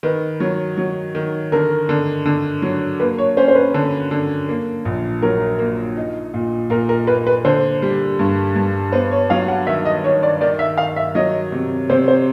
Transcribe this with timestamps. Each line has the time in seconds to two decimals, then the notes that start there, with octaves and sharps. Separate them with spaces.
0.03 D#3 B4
0.40 F#3
0.77 F#3
1.15 D#3
1.52 D3 A#4
1.89 D3
2.26 D3
2.62 F#3
3.00 A#3 B4
3.18 C#5
3.37 C#4 C5
3.48 C5
3.55 B4
3.74 D3
4.11 D3
4.49 A#3
4.85 A#1
5.22 F#3 A#4
5.59 A#3
5.97 D#4
6.34 A#2
6.70 A#2 A#4
6.89 A#4
7.07 A#3 B4
7.27 B4
7.45 D3 C5
7.82 G3
8.19 G2
8.56 G2
8.92 B3 C5
9.11 C#5
9.30 F#3 F5
9.48 F#5
9.67 D#3 E5
9.85 D#5
10.04 D#3 C#5
10.23 D5
10.41 D#3 D5
10.59 E5
10.78 D#3 F5
10.96 E5
11.15 F#3 D#5
11.52 C3
11.90 C3 C5
12.08 C5